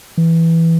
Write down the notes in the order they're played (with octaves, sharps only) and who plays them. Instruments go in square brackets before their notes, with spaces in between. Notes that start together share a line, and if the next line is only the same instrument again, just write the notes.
[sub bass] E3